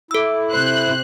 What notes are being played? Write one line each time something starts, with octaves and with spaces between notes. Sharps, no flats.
E4 A4 E6
C3 C5 F#6